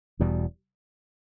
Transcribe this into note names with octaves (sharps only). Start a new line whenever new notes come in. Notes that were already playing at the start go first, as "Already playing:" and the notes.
E1 E2 B2 G3